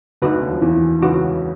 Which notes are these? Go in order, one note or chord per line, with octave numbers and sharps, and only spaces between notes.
D2 D3 D#4 F#4 B4
D#2 D#3
F3
E2 E3
C#2 C#3 D#4 F#4 B4